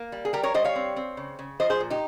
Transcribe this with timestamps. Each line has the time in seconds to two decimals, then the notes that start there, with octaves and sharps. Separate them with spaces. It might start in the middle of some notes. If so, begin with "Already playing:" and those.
Already playing: A#3
0.12 G3
0.25 G#4
0.33 G3 G4 A#4
0.43 A#4 C#5
0.54 G3 C5 D#5
0.64 C#5 F5
0.76 C4
0.96 C4
1.17 C#3
1.39 C#3
1.60 F3 C5 D#5
1.70 G#4 C5
1.80 A#2
1.90 D#4 G4